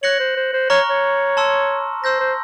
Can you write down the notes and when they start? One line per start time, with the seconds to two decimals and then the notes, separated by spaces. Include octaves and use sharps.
0.03 C#5 F#6 A#6 C#7 F#7
0.20 C5
0.37 C5
0.53 C5
0.70 C#5 A#5 C#6 F6
0.90 C#5
1.37 A5 C6 E6
2.04 C5 C6 E6 G6 A#6
2.20 C5